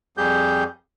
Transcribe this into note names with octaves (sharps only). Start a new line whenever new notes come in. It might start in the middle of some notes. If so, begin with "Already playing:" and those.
F2 G3 G4 G#4 G6